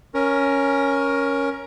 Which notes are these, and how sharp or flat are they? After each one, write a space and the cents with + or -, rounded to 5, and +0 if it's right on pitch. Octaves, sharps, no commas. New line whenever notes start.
C#4 +0 A#4 +10